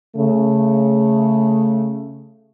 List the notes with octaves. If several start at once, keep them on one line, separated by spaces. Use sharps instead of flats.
C#3 A3